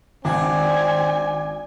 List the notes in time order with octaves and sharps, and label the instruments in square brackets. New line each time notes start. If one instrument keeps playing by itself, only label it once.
[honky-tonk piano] G#1 [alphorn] C4 [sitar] D4 [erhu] G#5